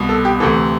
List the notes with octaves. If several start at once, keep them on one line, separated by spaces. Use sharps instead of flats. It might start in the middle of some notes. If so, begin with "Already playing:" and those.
Already playing: C2 B2
A4
G4
D2 C3 E3 A4